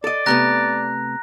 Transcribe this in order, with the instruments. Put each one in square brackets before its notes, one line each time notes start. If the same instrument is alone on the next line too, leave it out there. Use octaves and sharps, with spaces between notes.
[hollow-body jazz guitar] A4 D#5 [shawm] D5
[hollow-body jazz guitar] C3 A3 B3 [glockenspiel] A#5 F#6 A#6